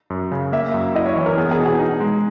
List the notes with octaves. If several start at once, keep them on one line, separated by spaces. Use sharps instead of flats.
F#2
C#3
A#3 E5
F#2
E4 D#5
C#5
E3
A#4
B3 G#4
G#4
B2
G#4
D#4
G#3